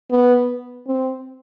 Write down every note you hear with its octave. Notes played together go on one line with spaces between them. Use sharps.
B3
C4